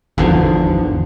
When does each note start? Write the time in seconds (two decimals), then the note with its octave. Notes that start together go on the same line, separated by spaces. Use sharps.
0.18 G#1 E2 D3 F3